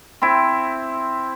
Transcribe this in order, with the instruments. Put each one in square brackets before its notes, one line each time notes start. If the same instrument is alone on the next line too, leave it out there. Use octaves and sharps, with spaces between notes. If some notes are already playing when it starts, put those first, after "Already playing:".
[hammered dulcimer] C4 E4